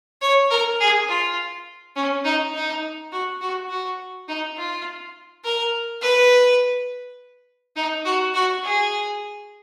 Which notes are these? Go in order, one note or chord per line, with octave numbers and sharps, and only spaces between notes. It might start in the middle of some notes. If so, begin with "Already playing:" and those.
C#5
A#4
G#4
F4
C#4
D#4
D#4
F#4
F#4
F#4
D#4
F4
A#4
B4
D#4
F#4
F#4
G#4